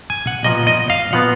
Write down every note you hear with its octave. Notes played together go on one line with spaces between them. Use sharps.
G#5
F#5
A#2 F3 B3 F4 D#5
D#5
F5
A#2 F3 B3 F4 F#5